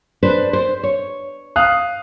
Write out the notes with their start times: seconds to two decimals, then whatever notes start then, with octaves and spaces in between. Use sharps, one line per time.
0.23 D4 B4 C5
0.53 C5
0.83 C#5
1.56 F5 D#6 F#6